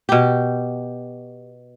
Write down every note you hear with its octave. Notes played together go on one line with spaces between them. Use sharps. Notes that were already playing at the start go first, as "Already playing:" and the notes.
B2 G4